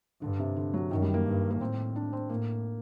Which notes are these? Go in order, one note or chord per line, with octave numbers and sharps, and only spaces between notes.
G2 D3
C3
D3
F#3
F#2 D#3
G3
A#3
G2
A#3
A2 C4
D4
C4
A2 A#3